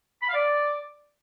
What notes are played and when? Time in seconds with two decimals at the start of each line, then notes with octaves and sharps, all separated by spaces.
0.21 B5
0.28 F5
0.34 D5